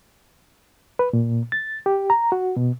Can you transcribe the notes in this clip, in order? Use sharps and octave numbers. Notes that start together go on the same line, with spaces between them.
B4
A#2
A6
G4
A#5
F#4
B2